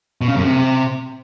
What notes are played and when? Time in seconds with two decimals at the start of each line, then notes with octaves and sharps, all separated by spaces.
0.21 B2
0.29 C#3
0.36 F#2
0.43 C3